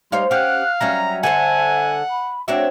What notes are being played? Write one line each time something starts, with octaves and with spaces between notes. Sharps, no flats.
G3 D#4 C5 C#5 F5 C6
C#4 G4 F5 F#5 F#6
F#3 G3 C#4 E5 A#5
D3 A4 C5 F#5 G#5
B5
C4 D4 F#4 C#5 E5